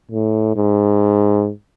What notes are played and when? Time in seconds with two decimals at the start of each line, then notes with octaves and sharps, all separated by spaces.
0.11 A2
0.56 G#2